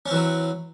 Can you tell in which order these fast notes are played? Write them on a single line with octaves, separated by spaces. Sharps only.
C#4 C4 E3 F#3